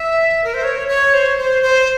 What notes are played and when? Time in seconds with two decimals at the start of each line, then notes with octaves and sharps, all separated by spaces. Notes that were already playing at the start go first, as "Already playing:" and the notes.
Already playing: E5
0.44 A#4
0.54 C5
0.64 C#5
0.88 C#5
1.14 C5
1.38 C5
1.62 C5